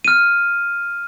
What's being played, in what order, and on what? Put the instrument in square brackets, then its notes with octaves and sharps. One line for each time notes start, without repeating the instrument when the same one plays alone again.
[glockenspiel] F6 D#7